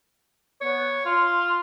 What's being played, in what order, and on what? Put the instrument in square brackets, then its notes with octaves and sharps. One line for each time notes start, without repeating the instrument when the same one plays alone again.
[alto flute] B3 [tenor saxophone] C#5
[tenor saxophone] F4 [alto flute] C6